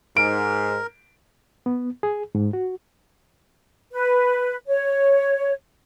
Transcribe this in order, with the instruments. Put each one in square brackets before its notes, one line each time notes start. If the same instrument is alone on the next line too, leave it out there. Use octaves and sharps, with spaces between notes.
[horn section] G#2 [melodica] A#4 [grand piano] D7
[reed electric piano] B3
G#4
G#2
F#4
[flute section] B4
C#5